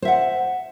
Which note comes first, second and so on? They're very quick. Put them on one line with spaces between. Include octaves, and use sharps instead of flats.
C5 E5 F#5